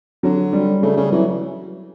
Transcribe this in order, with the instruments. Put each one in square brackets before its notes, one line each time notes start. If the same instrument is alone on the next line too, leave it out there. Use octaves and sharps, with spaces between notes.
[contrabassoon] D3 [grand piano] F#3
[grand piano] G3
[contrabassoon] C#3 [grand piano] A3
[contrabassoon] C#3 [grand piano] G3
[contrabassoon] E3 [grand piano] F#3